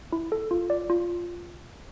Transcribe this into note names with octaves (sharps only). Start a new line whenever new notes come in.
E4
A4
F4
D5
F4